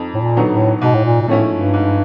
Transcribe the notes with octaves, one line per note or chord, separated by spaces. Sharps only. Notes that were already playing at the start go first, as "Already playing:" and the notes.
Already playing: F2 D#4
A2
A#2
D3 F#3 B3 D#4
A2
G#2 B2
A2
A#2
A#2
A2 F3 A3 C#4 E4
G2
G#2